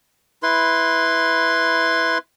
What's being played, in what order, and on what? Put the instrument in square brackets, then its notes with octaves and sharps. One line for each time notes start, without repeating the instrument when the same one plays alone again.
[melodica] E4 B4 C6